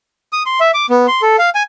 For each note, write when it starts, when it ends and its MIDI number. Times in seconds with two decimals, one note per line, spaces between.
0.33 0.43 87
0.46 0.60 84
0.60 0.71 76
0.74 0.86 86
0.90 1.07 59
1.08 1.22 84
1.22 1.36 69
1.39 1.50 77
1.55 1.63 80